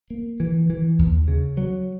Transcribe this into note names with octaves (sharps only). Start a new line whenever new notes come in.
A#3
E3
E3
D#2
C#3
F#3